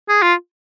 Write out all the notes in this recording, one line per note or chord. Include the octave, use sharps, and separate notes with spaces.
G#4
F4